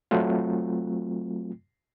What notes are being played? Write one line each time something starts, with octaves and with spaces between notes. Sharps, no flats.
F#3 A3 C4 F4